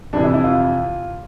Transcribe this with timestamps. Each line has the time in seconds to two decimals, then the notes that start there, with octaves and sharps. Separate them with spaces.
0.13 F2 C3 E3 D4
0.24 E4
0.34 E4
0.44 F4